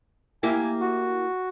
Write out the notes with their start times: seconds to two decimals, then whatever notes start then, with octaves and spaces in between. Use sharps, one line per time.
0.43 A#3 E4 G4 G#5
0.81 F#4